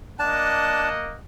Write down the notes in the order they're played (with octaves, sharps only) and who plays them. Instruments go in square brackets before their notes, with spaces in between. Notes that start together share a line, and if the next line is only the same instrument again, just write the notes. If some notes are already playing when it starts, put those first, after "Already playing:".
[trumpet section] A#3 D#5 F#5 [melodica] D4 A5